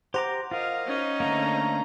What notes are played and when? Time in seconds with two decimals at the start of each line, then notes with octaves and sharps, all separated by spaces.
0.14 G4 C5 F#5 A#5 D6
0.51 F4 A#4 D#5 F5
0.86 C#4 D#4
1.20 D3 A3 A#3 A#5